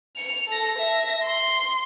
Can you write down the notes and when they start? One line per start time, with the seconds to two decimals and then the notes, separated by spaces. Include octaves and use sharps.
0.17 C#7 F7
0.48 A4 A#6
0.79 E5 A#6
1.24 C6